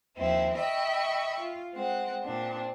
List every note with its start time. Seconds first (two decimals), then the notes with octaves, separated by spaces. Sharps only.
0.18 D#2 F3 C4 E4
0.56 D#5 E5 G5 B5 C#6
1.40 F4
1.73 G#3 C4 F#5
2.22 A#2 C4 D4